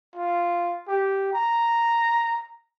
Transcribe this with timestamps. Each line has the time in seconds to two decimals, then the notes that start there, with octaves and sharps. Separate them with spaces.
0.16 F4
0.88 G4
1.34 A#5